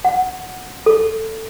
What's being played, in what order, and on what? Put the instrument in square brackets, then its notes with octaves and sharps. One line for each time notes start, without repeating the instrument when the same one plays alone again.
[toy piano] F#5
A4